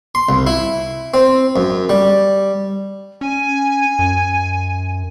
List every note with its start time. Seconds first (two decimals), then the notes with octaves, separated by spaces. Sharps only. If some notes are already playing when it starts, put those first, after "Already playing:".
0.15 C6
0.29 C2
0.47 E4
1.14 C4
1.56 F#2
1.89 G3
3.21 C#4 G#5
3.99 F#2